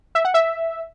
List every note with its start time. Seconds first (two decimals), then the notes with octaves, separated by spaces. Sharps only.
0.15 E5
0.25 F#5
0.34 E5